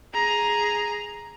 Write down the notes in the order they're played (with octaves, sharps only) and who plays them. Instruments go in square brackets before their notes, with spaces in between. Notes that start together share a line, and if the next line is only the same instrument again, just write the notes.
[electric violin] G#4 A#5